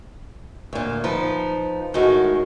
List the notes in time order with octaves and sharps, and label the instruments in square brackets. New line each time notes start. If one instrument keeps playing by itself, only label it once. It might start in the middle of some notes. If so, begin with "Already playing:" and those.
[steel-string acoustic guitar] D2 A#2
F3 D#4 B4
[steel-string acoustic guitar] A2 D#3 G#3 [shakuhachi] F#4